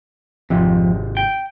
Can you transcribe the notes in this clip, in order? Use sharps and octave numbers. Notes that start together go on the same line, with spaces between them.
G#1 F2 C3
G5